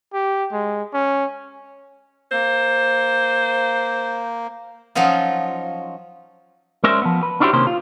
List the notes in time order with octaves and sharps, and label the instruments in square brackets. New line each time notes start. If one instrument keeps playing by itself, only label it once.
[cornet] G4
G#3
C#4
[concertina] A#3 [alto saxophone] C5
[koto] F3 F#3 C#4 D#4 F4
[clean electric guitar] G#3 C#4 A#4 C5 D5 E5
F3 B3
B4
C#4 D4 E4 F#4 G4 C5
C3 D#3 A#3 C#4 C5
F4